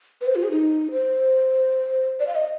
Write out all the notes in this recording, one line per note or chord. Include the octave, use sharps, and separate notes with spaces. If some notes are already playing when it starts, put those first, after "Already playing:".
B4
C5
F4
G#4
D#4
C5
D5
F5
D#5